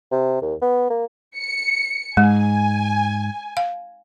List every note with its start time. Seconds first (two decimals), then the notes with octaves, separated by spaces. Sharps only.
0.11 C3
0.41 D#2
0.62 B3
0.90 A#3
1.37 C#7
2.17 G#2 G#3 G#5
3.57 F5